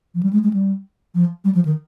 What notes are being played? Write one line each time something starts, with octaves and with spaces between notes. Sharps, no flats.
F3
G3
G#3
G#3
G3
F3
G3
F3
D#3